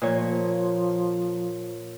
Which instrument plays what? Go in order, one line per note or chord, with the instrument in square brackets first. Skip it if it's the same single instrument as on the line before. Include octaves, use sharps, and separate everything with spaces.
[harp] A#2 C#5 [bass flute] F3